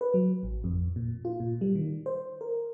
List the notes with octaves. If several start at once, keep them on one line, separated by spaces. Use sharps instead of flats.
B4
F#3
A1
F2
A#2
F4
A#2
G3
D#3
C5
A#4